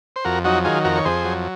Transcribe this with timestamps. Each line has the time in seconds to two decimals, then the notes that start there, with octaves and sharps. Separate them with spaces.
0.16 C5
0.25 F2 F#4 A#4
0.44 F#3 D#4 F#4
0.64 D#3 F4 G#4
0.85 F2 F#4 A#4
0.96 C#5
1.05 F2 G#4 C5
1.25 F#3